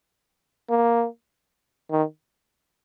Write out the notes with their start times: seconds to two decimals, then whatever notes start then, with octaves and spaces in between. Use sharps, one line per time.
0.70 A#3
1.91 D#3